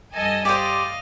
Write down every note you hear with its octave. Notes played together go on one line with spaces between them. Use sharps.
G2 A4 D#5 G#5
G4 C5 D5 D#5 F5